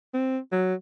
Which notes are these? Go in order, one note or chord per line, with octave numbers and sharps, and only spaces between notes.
C4
F#3